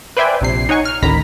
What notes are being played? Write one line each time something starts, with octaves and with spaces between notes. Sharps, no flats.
B4 C5 D5 E5 G5 G#5
A#1 C3 C7
D#4 C#5 F#5 G#5 C#6
F6
A1 D2 D#3 A#5 B5 B6